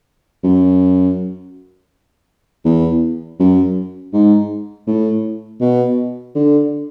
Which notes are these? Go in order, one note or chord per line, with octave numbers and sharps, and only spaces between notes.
F#2
E2
F#2
G#2
A2
B2
D3